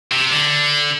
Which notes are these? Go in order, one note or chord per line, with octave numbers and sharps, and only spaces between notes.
C3
D3